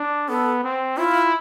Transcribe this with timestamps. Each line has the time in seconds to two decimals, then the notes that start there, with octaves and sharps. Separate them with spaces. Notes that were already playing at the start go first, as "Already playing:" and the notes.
Already playing: D4
0.29 B3 A4
0.64 C4
0.97 E4 F4